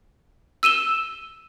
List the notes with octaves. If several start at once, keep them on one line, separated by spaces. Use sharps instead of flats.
E6 D#7 E7 G7